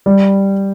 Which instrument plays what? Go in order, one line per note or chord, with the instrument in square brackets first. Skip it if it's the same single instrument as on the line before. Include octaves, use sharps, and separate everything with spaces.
[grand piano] G3